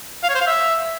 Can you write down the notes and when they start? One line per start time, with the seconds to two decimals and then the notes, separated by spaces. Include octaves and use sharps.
0.23 F5
0.29 C#5
0.35 C5
0.41 F5
0.47 E5